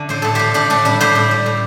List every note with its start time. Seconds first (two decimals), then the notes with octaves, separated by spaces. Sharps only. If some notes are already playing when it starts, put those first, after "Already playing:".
Already playing: D3 A3 D5
0.09 A2 C5
0.22 A2 A4
0.35 A2 G4 C5
0.54 A2 D4 G4
0.70 A2 D4
0.85 G3 D4
1.01 A2 G4 C5
1.15 A2
1.31 G3
1.46 A2